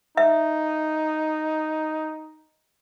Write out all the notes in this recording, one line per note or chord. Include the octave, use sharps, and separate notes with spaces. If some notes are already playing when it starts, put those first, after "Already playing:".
D#4 E5